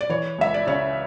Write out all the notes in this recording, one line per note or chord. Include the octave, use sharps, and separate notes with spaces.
D5
E3 C#5
C#2 E5
D5
C#3 C#5